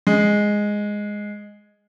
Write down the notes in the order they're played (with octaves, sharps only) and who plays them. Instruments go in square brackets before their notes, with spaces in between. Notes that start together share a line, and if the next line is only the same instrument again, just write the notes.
[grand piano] G#3